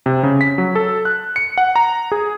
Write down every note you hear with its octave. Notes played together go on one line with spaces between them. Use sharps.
C3
C#3
B6
F#3
A4
F#6
C#7
F#5
A#5
G#4